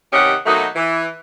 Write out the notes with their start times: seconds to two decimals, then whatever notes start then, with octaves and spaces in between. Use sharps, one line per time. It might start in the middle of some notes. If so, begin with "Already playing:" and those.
0.13 C3 D#3 C#4 G4 D#5 F#5
0.46 B2 F#3 A3 A#3 D#4
0.76 E3